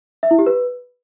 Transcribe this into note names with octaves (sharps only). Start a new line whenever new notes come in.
E5
E4
G4
B4